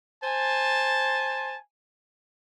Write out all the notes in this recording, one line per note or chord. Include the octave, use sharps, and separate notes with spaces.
C5 G#5 A5